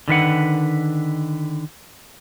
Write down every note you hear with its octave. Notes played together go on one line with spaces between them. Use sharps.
D3 D#3 B4 F#5